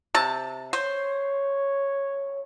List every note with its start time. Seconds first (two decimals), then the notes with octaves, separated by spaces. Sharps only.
0.15 C3 A5
0.73 C5 C#5